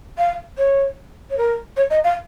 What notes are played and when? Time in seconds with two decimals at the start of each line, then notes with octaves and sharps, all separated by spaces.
0.18 F5
0.58 C#5
1.30 C#5
1.37 A#4
1.77 C#5
1.90 D#5
2.04 F5